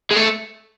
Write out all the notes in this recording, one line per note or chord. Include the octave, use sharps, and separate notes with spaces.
G#3
A3